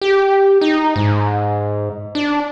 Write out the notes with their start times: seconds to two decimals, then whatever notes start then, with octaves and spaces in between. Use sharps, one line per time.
0.01 G4
0.61 D#4
0.96 G#2
2.15 D4